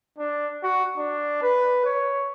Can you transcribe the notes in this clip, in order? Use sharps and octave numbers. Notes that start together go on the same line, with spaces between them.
D4
F#4
D4
B4
C#5